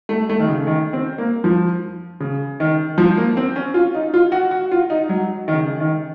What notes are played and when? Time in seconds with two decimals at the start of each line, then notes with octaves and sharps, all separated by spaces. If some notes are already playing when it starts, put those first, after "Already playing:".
0.09 A3
0.29 A3
0.39 D#3
0.48 C#3
0.67 D#3
0.93 C4
1.18 A#3
1.44 F3
2.20 C#3
2.60 D#3
2.98 F3
3.17 A#3
3.37 C4
3.56 C#4
3.74 F4
3.95 D#4
4.14 F4
4.32 F#4
4.51 F#4
4.71 F4
4.90 D#4
5.09 F#3
5.48 D#3
5.54 C#3
5.80 D#3